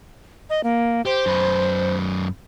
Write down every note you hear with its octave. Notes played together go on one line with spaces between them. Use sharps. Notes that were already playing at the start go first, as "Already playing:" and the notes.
D#5
A#3
G4 C5
F#2 B4